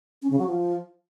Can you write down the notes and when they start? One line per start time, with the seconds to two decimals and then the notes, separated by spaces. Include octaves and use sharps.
0.22 C#4
0.30 C#3
0.39 F#3
0.47 F3